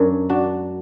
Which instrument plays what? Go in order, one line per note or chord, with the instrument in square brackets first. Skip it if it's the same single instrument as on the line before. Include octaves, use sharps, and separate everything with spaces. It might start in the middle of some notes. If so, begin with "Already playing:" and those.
Already playing: [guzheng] F#2 [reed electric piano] D4
[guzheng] D4 [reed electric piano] F#4